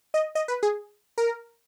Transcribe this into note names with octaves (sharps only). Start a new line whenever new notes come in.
D#5
D#5
B4
G#4
A#4